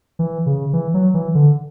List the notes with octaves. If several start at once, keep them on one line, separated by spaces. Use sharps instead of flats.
E3
C#3
E3
F#3
E3
D3